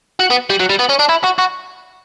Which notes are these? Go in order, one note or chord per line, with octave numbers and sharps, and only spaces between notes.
F#4
B3
G3
F#3
G3
B3
C#4
D4
E4
F#4
F#4